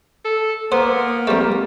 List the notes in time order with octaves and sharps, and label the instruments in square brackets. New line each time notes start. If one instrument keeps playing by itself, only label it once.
[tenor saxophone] A4
[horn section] A#3 [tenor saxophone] B3 [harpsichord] C5
[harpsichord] F2 A3 [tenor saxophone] G3